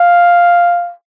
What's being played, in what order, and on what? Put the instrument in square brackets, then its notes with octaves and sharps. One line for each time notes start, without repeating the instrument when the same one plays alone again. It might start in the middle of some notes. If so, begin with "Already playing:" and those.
Already playing: [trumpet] F5